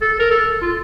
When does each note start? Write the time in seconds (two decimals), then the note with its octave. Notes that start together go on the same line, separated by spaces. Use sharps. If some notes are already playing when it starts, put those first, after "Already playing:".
0.01 A4
0.19 A#4
0.31 A4
0.62 F4